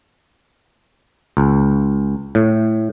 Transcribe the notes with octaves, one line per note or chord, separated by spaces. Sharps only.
C#2
A2